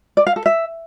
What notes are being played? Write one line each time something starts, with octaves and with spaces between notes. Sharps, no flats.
D5
F5
A4
E5